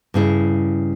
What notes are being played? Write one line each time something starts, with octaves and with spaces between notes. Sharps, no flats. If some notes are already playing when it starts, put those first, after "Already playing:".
G2 C#3 E4